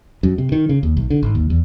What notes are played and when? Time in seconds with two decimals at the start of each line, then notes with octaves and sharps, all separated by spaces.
0.23 F#2
0.38 C3
0.52 D#3
0.69 C#3
0.83 D#2
0.97 B1
1.10 D3
1.23 G#1
1.35 D#2
1.50 E2